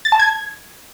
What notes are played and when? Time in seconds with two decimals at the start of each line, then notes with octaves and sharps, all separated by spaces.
0.05 A6
0.12 A5
0.19 G#6